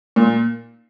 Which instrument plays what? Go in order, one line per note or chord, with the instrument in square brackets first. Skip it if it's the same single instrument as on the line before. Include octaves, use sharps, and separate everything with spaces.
[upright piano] A#2